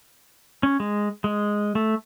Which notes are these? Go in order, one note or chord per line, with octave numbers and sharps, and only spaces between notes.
C#4
G#3
G#3
A3